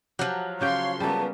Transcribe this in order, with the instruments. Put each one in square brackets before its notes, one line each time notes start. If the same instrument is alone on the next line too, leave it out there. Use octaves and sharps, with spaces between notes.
[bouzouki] F3 F#3 [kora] G4
[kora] C#3 G4 G5 [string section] C#5 C6 [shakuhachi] F5
[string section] C#3 B3 [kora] G3 A#3 [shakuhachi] A5